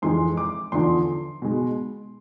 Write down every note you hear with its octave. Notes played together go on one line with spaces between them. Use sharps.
F2 E3 G#3 C6
D6
E2 D3 F3 C6
B2 G#3